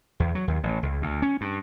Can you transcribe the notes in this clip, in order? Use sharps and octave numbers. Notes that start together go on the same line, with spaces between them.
E2
F#3
D#2
A1
C#2
D2
C#4
G2